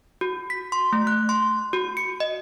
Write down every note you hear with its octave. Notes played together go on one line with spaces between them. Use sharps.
F#4
B6
C6
A3
F#6
C6
F#4
C#7
D#5